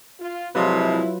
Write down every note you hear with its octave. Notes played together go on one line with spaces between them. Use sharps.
F4
C3 F3 F#3 G#3 E4 F4 B4